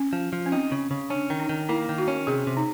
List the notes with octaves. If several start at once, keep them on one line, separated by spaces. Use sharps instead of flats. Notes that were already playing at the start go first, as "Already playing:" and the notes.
Already playing: C#4
F3
F3
C#4
C4 D#4
C#3
C#3
C#4 D4
D#3
D#4
D#3
A#3 E4
D#3
F#4
C#4
C3 G#4
C3
D#4